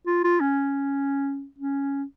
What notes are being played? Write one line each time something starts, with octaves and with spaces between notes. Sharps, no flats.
F4
F4
C#4
C#4